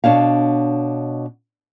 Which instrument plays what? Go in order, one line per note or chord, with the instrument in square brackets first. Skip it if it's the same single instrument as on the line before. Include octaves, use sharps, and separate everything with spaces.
[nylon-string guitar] B2 D4 C#5 F5